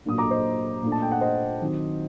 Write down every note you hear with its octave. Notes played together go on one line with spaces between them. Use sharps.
A#2 F#3 A#3 D4 D#6
A#5 D6
C5 D#5
A#2 A3 D4
A5
G5
F#5
C5 D#5
D#3 F#3 C4